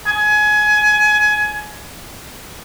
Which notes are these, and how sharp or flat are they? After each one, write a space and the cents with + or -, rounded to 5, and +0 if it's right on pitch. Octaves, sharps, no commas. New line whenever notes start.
G#5 +25